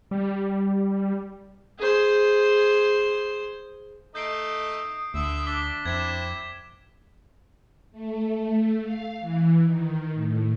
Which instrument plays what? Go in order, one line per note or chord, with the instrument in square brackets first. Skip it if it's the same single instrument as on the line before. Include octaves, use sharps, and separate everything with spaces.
[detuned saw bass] G3
[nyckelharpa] G#4 C5
[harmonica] A3 D#4 [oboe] D#6 [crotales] G6 C7 D7
[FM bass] D2 [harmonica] D3 E5 E6
[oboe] D4 [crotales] D6 B6 G7
[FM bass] F2 [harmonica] C4 E4 [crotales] G#6 B6 E7
[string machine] A3
F5
E3
D#3
A2